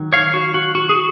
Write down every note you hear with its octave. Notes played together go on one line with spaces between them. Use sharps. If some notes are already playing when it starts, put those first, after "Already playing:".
Already playing: D#3 F#3
C#5 F5
F#4
F#4
F#4
G#4
F#4